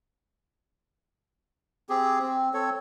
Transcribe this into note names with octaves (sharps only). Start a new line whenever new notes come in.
C4 G4 G#4
C4
C4 A4 C#5